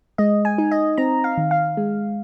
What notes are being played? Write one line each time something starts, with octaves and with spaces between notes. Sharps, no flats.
G#3 D#5
G#5
D#4
D#5
C4 A#5
F5
D#3
F5
G#3